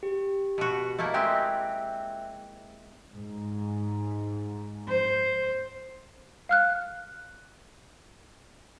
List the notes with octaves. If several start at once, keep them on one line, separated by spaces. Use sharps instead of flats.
G4
B2 F#4
A3 A#3 E4 D#5
G#3 C4 G4 E5 G5 F#6
G#2
C5
F5 F6 F#6